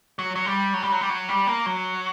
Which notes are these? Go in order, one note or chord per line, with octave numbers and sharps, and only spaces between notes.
F#3
F#3
G3
F#3
G3
F#3
G3
F#3
G3
A#3
F#3